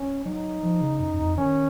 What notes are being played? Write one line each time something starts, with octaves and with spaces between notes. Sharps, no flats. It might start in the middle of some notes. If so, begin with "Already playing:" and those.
Already playing: C#4
F#3 D#4
F3
C#3
F#2
F#2
F2
D#3 C#4